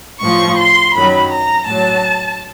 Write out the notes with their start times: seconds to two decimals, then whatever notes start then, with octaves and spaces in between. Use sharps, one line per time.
0.21 A2 F3 C#6
0.57 C6
0.94 F#2 D#3 F#3 B5
1.30 A#5
1.67 A2 F#3 A5